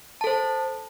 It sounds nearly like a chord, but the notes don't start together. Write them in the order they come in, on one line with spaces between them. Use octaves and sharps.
A5 A4 C5